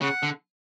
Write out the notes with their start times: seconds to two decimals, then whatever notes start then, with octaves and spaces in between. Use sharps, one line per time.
0.01 C#3 F#5
0.23 D3